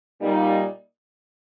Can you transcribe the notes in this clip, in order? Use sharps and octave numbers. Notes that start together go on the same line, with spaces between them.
A#2 G3 A#3 D#4